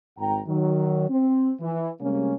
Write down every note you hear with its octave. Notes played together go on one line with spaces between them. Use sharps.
G#1 G5 A#5
D#3 F#3
C4
E3
C3 G3 G#3 A#3 C#4